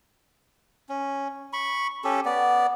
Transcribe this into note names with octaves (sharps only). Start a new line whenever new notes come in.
C#4
B5 C#6
C#4 G4 A4
B3 D5